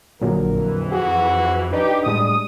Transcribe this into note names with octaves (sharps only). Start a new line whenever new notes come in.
A#1 A#2 D3 F#3 A#4
F2 E3
F#4 G#4
D4 D#4 G4 B4 D5
A2 G3 G#3 D4 D#6